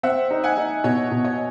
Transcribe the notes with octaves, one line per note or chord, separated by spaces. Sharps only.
C4 E5 F#5
D#4
F#5 G#5
D#4
B2 C#5 D#5
B2
C#5 D#5